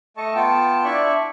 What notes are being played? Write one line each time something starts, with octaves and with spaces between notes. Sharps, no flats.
A3 A4 D#5 A5 C#6
B3 F4 G5 A5
D4 E4 D5 E5 C#6